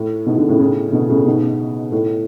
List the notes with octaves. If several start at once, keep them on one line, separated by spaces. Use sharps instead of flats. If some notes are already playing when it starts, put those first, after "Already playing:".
Already playing: A2
G#2 B2
B2 D3
A2 C#3
A2 C#3
B2 D3
A2 C#3
G#2 B2
A2